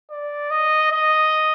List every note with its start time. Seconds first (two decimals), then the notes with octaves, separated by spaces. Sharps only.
0.10 D5
0.51 D#5
0.91 D#5